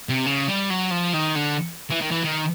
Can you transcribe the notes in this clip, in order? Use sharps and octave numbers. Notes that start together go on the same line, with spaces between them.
C3
C#3
G3
F#3
F3
D#3
D3
E3
D#3
E3
D#3